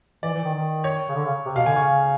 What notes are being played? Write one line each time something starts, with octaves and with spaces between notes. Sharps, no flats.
E3 D5
E3
D#3
D#3
C#5
C#3
D3
C#3
C3
B2 F5
D3 G#5
C#3 C#6